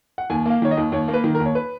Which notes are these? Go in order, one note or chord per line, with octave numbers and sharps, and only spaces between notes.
F#5
D#2 G#5
A#3 F5
D#3 C#5
D#5
D#2
D#2 C#5
A#3
B4
D#3
A#4
D#2
C#5
B4